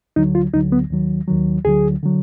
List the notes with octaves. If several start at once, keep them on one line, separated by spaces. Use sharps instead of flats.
D2 D3 F#3 D#4
F4
D2 D3 F#3 D#4
B3
D#2 D#3 F#3
D#2 D#3 F#3
D2 D3 F#3 G#4
D3 F#3